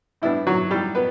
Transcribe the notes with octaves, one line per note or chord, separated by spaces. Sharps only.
A2 G3 B3 D4 E4
F#3 F#4
G3 G4
B3 B4